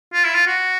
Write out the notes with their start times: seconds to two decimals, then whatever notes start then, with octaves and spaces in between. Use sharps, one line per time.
0.14 F4
0.25 E4
0.35 F4
0.47 F#4